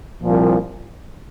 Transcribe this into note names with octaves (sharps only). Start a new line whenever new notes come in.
C2 A#2 F3